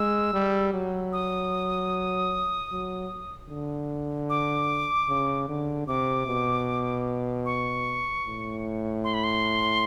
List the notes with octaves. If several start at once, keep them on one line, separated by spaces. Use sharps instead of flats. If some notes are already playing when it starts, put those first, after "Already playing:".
Already playing: G#3 E6
G3
F#3
D#6
F#3
D3
D6
C#3
D3
C3 D6
B2
C#6
A2
C6
B5
C6